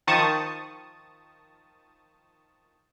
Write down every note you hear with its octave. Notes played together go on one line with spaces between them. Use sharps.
D#3 F3 A5 C#6 D#6